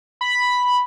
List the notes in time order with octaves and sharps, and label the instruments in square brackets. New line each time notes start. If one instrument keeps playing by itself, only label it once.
[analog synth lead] B5